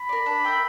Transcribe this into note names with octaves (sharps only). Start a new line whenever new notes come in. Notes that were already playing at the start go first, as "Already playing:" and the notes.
Already playing: B5
A#4 D5
D4
A#4 E5 G5